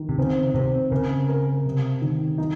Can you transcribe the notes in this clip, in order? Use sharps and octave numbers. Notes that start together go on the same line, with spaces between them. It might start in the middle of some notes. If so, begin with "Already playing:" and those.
Already playing: D#3
C3
C#3 C4
C3 C4
C#3 A#4
A#4
C3
D#3
D#4